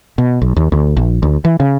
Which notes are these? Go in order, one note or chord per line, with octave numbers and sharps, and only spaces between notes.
B2
B1
D#2
D2
A#1
D2
E3
C#3